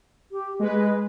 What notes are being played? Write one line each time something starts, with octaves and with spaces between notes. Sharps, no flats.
G4
G#3 B4 D#5